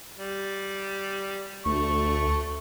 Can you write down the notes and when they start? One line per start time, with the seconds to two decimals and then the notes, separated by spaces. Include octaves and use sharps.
0.17 G3
1.66 D2 A3 C#6